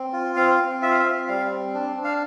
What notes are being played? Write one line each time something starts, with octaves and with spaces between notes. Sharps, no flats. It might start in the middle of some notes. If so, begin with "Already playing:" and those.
Already playing: C4
F4
C4 F5
C4
F4 E5
F5
E5
C4
G3 F5
C4
D4
D4
F5